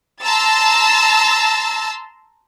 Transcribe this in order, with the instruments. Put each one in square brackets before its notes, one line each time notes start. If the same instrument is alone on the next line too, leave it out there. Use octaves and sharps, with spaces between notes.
[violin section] A5 A#5 C6 E6 A6